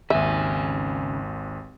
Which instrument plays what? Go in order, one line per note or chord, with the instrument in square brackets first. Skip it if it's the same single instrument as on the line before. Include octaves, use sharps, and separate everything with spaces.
[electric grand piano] G#1 D#2 [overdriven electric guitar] C#3 G#5 [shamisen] E5